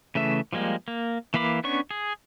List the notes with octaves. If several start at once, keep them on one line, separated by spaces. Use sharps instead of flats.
C#3 E3 A3 E5
F3 G3 G#3 A#3
A#3
E3 A#3 F5 B5 D6
B3 C#4 D4 C#5 C#6
G#4